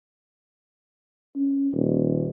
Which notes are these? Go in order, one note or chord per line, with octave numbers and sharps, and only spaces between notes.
C#4
D#1